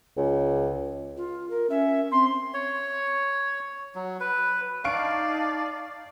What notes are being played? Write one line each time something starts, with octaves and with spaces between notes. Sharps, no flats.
C#2
F4
A#4
C#4 E5
C4 C6
C#5
F#3
B4
D#4 D5 F5 A5 C#6 D7